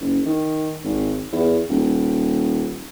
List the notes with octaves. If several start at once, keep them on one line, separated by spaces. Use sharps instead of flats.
F#1
D#3
G#1
E2
D#1